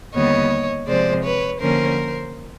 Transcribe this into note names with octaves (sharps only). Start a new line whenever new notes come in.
D#2 D3 G3 B3 C#5 D#5
C3 F3 G#3 C5 D5
B4 C#5
D3 F3 A#3 C#4 A#4 C5